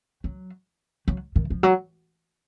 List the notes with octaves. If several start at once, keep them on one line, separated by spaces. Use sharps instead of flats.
F#3
F#3
D#3
F3
F#3